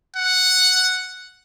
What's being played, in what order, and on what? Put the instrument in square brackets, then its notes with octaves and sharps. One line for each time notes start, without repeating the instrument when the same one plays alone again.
[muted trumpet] F#5